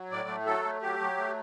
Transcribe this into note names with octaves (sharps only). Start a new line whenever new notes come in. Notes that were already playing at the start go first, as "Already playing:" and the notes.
Already playing: F#3
A2 D5
A3
F#3 A4
A3
F#3 G4
F#3
A3